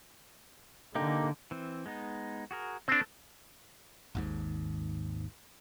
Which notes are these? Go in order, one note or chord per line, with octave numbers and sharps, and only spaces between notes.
D3 A#3 D#4 G4
E3 C4
G#3 B3 D#4
F#4 G#4 A#4
C4 D4 A4
G#1 D#2 G#2